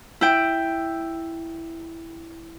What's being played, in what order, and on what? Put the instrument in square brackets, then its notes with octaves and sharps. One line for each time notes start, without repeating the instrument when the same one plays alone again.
[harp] E4 G5